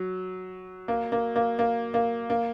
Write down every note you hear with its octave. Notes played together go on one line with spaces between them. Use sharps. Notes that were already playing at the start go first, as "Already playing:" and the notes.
Already playing: F#3
A#3
A#3
A#3
A#3
A#3
A#3